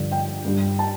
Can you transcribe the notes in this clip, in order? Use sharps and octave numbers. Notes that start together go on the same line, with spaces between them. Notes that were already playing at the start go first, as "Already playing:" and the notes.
Already playing: G2 D3 F3
G5
G2 G3
A5